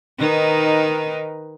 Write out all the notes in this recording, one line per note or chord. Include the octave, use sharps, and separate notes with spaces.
D#3 D#4 B4